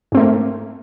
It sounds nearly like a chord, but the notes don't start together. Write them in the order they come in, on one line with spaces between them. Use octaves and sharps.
G#2 C4 A3 A#3